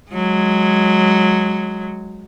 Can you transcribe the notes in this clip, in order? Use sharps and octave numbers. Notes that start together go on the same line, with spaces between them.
F#3 G#3